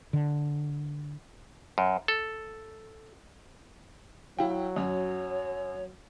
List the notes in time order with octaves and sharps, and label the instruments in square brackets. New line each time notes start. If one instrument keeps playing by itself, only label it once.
[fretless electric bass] D3
[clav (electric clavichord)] F#2
A4
[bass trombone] F#3 [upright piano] E4 F5 G5
[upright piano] F#2 [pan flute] C#5